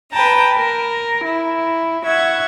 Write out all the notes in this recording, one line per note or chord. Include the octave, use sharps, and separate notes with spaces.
B4 G5 A5 A#5
A#4
E4
E5 F#5 C#6 G#6